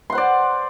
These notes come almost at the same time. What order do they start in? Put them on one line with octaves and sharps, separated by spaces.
C6 F#5 C5 D5